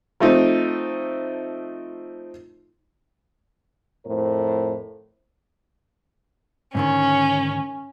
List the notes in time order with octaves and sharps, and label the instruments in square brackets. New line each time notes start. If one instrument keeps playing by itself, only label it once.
[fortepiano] F3 A3 C4 D#4
[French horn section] F2 A2 A#4 C5
[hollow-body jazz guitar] G#2 D3 D#3 [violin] C#4